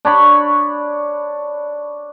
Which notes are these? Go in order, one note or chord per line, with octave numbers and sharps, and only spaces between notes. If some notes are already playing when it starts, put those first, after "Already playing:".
D4 C#5 B5 C#6